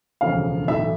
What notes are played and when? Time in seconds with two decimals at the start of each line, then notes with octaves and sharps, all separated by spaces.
0.21 E1 D2 C#3 F3 F5
0.68 B1 A2 E3 E5